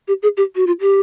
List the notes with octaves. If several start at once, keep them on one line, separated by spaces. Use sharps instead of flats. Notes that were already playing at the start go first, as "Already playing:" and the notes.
G4
G#4
G4
F#4
F4
G4